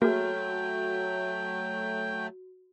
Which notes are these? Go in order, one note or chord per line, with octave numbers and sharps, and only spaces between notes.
F#3 A3 A#3 F#4 G#4 G5